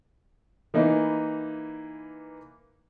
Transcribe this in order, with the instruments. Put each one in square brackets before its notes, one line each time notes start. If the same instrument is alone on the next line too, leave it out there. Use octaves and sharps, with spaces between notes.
[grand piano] E3 A#3 D#4 B4